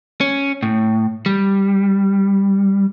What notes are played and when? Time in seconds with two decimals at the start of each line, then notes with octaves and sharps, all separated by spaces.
0.21 C#4
0.63 A2
1.26 G3